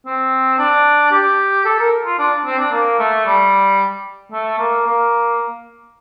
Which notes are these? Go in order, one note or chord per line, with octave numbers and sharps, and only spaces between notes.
C4
D4
G4
A4
A#4
F4
D4
C4
D4
A#3
A3
G3
A3
A#3
A#3